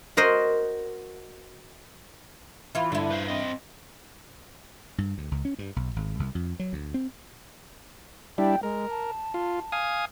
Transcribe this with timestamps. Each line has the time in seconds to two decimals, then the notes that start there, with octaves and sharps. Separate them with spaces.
0.17 F#4 A#4 C5 D#5
2.75 E3 E4 F4
2.92 G2 D3 E4
3.10 B4 C5 F5
3.28 C4 D#5
4.98 G2
5.18 D2
5.31 C#2
5.45 C#4
5.59 G2
5.76 B1
5.96 G#1
6.19 C2
6.35 F2
6.59 F#3
6.73 D2
6.94 C4
8.38 G3 D4 E4 G5
8.63 G#3 A#4
8.90 A5
9.34 F4
9.72 F5 G#5 D#6